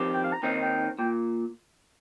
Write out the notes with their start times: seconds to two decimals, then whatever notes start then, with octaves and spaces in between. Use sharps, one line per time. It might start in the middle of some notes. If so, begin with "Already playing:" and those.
Already playing: F2 D#3 C4 G4
0.14 G5
0.24 F5
0.33 A#5
0.43 D#2 D#3 C4 D#4 G5
0.62 G5
0.99 A#2 G5